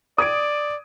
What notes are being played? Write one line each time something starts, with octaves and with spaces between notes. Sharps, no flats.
D5 D#6 G#6 D7